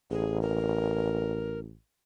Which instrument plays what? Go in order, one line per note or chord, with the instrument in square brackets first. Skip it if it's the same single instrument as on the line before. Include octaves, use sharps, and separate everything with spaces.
[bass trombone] A1 [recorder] G#4
[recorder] A#4